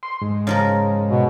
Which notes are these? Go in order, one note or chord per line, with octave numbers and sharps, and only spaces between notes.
C6
G#2
C#3 F3 A#4
B2